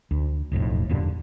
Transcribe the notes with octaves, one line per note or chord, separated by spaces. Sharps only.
D2
E1 B1 F2 A2
E2 G2 A#2 D3